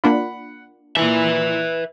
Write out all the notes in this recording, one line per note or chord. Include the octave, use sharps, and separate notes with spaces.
A#3 D4 F4 F#5 B5
A#2 E3 B4 E5